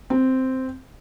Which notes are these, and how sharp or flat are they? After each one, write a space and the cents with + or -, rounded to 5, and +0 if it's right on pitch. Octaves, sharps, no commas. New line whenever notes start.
C4 -5